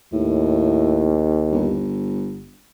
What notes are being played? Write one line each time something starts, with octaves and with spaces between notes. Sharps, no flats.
D#2 A2
G1